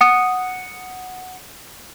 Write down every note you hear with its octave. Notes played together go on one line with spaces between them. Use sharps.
F#5 D#6